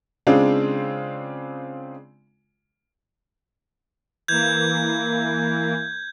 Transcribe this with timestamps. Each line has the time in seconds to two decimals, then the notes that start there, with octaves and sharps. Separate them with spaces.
0.27 C#3 G#3 C4 D4 F4
4.28 E3 A#3 G6 G#6